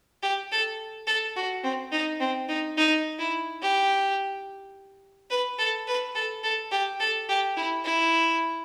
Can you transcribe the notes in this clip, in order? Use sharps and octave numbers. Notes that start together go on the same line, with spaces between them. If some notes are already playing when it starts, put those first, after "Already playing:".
G4
A4
A4
F#4
C4
D#4
C4
D#4
D#4
E4
G4
B4
A4
B4
A4
A4
G4
A4
G4
E4
E4